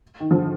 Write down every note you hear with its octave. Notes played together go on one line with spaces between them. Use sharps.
D#3
D3 F3